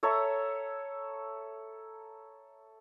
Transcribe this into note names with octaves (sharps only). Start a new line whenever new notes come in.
A4 C#5 E5 A#5